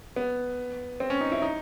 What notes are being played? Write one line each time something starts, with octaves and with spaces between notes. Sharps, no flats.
B3
C4
C#4
D#4
E4
D#4